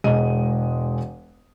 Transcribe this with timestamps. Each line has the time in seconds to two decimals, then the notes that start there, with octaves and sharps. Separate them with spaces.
0.04 E1 G#3 D#5 D#7